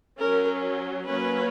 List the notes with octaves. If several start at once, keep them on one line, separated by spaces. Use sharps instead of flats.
F#3 C#4 A#4
F#3 A#3 C#4 B4